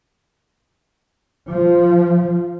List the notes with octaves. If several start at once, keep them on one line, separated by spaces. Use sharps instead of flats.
F3